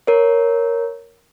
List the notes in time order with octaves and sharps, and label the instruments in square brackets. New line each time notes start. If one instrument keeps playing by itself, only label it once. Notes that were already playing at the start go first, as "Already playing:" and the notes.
[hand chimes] A#4 C#5